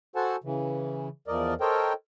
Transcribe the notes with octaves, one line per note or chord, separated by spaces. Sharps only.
F#4 A4 C5 F#5 G#5 A5
C#3 E3
E2 F3 A#4 D5 D#5
A4 A#4 C5 C#5 D#5 G5